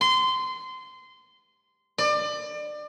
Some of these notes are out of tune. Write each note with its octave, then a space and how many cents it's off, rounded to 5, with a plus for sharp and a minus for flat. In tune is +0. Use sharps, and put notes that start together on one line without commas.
C6 -20
D5 +30